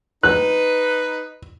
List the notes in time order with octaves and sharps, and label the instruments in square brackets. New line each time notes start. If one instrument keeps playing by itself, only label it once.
[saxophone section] D#4 B4 [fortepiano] F#6